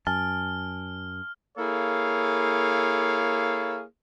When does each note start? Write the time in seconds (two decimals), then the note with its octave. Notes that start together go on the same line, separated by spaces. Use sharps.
0.07 F#2 G#5 A5 F6
1.57 A#3 E4 G#4 A4 C#5 F5